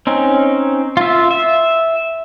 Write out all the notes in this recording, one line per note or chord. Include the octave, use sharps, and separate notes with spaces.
C4 C#4 D#4
F4 E5
E5